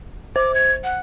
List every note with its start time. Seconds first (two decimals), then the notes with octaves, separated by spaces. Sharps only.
0.36 C5 D6
0.54 G#6
0.84 F#5